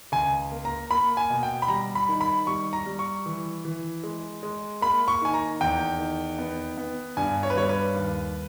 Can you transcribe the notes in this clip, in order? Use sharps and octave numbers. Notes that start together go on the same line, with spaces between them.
C#2 G#5
A#3
A#5
A#3 B5
G#5
B2
G5
B5
G3 A#5
B5
D#3
B5
G3 C#6
A#5
G3
C#6
E3
E3
G#3
G#3
A#3 B5
C#6
D#3 G#5
A#5
E2 G5
D#3
B3
B3
G2 G#5
C#5
B4
G3 C#5
B4
D#2